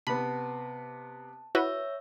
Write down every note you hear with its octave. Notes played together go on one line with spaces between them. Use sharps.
C3 B3 A5 B5
E4 F#4 B4 C#5 E5 E6